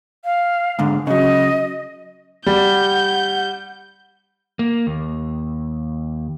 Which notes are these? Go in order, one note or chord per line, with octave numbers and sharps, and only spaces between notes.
F5
G#2 D3
C#3 F#3 D#5
G3 F#5 G6
A#3
D#2